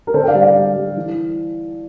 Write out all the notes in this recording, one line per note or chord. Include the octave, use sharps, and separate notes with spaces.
A#4
D3 A4 C5
G5
D5 F5
G3
D5 F5
G3
G3
E3